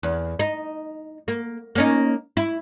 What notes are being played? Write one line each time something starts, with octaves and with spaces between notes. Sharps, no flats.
E2
D#4
A#3
A#3 C#4 D#4
E4